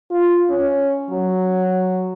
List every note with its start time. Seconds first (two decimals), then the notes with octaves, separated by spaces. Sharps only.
0.11 F4
0.50 C#4
1.10 F#3